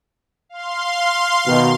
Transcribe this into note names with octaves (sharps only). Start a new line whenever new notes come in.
F5 C6
B2 D#3